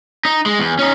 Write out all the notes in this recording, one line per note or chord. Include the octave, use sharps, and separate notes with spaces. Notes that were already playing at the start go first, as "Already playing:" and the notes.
D#4
G#3
E2
C#4 D#4